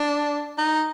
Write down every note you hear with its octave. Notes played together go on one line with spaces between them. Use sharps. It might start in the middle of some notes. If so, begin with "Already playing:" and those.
Already playing: D4
D#4